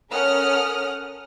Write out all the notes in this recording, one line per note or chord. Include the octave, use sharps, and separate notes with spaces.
C#4 A4 A#4 F#5 D#6 F6